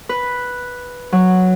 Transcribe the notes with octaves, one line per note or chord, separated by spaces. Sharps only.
B4
F#3